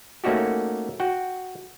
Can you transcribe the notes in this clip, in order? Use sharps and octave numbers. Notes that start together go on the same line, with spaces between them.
A3 A#3 C#4 D#4 F#4 G4
F#4 F#5 G5